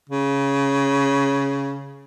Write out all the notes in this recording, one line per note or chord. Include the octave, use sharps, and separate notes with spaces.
C#3